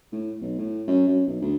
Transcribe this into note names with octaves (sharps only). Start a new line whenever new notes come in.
A2
B1
A2
F#2
F#2
B1
D2